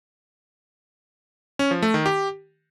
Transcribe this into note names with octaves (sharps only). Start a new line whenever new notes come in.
C#4
F3
A3
D#3
G4